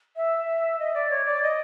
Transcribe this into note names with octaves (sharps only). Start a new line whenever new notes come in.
E5
D#5
D5
C#5
D5
D#5